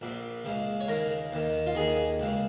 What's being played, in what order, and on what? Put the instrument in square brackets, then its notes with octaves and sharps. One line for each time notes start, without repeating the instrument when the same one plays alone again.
[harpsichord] A#1 A#2
C#2 C#3
C#5
D#2 C#3 A#4
D#2 D#3
F4
D#2 D#3 G#4
C#2 C#3